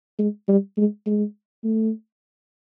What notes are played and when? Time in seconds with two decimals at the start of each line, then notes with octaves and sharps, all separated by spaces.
0.19 G#3
0.48 G3
0.77 G#3
1.07 G#3
1.64 A3